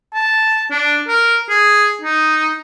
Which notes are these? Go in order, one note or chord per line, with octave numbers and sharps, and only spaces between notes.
A5
D4
A#4
G#4
D#4